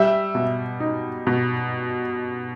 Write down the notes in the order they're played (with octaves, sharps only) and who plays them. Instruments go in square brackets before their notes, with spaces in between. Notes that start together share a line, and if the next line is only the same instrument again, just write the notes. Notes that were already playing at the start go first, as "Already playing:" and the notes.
Already playing: [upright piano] G3 [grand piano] E5
[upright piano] B2
D#4
B2